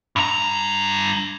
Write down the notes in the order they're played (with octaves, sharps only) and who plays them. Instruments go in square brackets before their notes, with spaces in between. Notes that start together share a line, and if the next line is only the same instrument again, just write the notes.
[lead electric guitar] G2 A#5